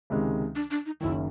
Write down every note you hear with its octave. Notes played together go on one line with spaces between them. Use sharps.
C#2 C3 D#3 G#3
D4
D4
D#4
F#1 F#2 D#3 E4